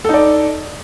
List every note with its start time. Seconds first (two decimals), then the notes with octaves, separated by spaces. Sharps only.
0.05 A4
0.09 D#4
0.14 D5